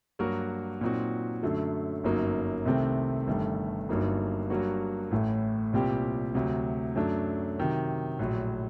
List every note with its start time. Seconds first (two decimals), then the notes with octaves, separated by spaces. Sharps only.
0.19 G2 F#3 A#3 F#4 A#4
0.81 A#2 F#3 C4 D#4 F#4
1.43 F#2 D3 F#3 A3
2.04 G1 F#2 F#3 A#3 D#4
2.66 C2 C3 D#3 A3 C4
3.27 G1 G2 D#3 A3
3.89 G1 G2 F#3 A#3 D#4
4.50 G2 F#3 A#3 F#4
5.11 A1 A2 A3
5.73 C2 A#2 G3 C4 G4
6.35 D2 C3 F#3
6.95 F#2 F#3 A3 D4
7.58 C3 D#3 F#3
8.19 A#1 A2 F#3